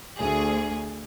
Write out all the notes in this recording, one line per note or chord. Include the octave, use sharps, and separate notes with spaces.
D2 G#4